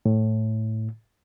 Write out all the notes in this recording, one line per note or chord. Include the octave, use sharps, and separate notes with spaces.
A2